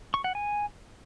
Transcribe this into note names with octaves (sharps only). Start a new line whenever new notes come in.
C#6
F#5
G#5